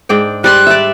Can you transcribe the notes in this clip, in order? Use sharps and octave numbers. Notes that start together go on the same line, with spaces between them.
G#2 D4 G5
G3 D5 C6 F#6
D5 E5